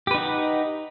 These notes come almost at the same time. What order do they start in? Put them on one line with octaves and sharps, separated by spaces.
G4 B4 D#4 F#5